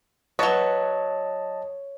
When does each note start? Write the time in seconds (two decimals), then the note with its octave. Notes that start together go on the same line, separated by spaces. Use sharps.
0.39 F#3 B4 C#5 D#5 A5